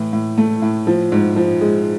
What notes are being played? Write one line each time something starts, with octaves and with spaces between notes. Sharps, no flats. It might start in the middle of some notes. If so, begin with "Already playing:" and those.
Already playing: A2 E3
A2
A3
A2
F3
G#2
F3
G#3